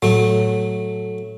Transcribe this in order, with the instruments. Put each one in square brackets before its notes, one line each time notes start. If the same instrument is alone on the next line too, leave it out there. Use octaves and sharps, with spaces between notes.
[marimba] A2 [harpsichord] F#3 A3